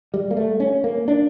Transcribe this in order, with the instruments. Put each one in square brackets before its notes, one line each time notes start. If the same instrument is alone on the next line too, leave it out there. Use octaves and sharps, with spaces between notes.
[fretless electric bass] G3
A#3
A3
C#4
A#3
D4